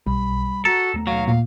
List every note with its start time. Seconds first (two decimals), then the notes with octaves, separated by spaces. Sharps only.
0.07 B1 G3 B5
0.65 F#4 A4 A#5
0.94 D#2 A3 B3
1.07 B1 F#3 F5
1.27 A#2 F5